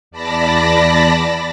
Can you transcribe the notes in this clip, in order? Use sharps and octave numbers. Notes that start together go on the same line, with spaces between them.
E2 D5 A5 B5 A#6